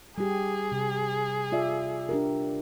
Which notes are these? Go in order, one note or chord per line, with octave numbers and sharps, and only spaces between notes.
G3 G4 G#4
C3
F4 D5 E5
D4 G4 A#4